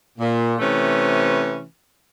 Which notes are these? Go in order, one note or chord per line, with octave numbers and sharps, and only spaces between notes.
A#2
C3 E3 A3 C#4 B4